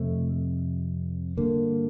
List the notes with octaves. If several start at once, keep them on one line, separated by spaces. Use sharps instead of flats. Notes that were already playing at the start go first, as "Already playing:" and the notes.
Already playing: F2 C3 A3
G2 D3 A#3